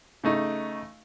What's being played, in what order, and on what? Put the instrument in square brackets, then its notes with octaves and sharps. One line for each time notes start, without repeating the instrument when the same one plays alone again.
[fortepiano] C#3 A3 D#4